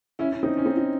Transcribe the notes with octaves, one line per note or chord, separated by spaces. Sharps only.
C#4 E4
C#4
C4 D#4
C#4
C4 D#4
D#4